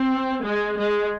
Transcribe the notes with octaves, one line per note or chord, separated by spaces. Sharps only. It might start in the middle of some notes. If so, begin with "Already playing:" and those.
Already playing: C4
G#3
G#3